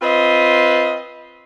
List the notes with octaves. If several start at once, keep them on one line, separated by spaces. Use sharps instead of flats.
C4 F4 B4 D#5